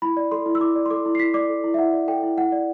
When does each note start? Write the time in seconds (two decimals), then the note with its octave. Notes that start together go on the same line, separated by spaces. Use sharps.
0.02 E4 B5
0.17 D5
0.31 A4 C6
0.46 E4
0.55 E6
0.60 E4 D6
0.75 D5
0.86 C6
0.90 A4 D6
1.05 E4
1.15 C7
1.19 E4 B6
1.34 D5 D6
1.49 A4
1.64 E4
1.74 E5
1.79 E4 F#5
1.93 D5
2.08 A4 G5
2.23 E4
2.37 E4 F#5
2.52 D5